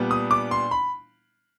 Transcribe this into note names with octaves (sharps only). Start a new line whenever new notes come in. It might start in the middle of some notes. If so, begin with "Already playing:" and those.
Already playing: A#2 G3 B3 D4
D#6
D6
C6
B5